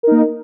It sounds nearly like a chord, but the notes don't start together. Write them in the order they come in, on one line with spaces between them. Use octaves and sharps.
A#4 D#4 A#3